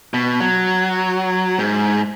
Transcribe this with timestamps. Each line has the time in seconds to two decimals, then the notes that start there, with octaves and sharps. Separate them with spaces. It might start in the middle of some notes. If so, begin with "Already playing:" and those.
0.14 B2
0.40 F#3
1.59 G#2